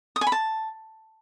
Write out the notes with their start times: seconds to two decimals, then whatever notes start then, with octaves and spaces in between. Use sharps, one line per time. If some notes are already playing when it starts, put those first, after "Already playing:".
0.16 D#6
0.21 G#5
0.27 B5
0.32 A5